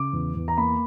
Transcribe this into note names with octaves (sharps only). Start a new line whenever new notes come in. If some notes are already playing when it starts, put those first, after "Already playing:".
Already playing: C#3 D6
E2
E2
A#5
A#3 B5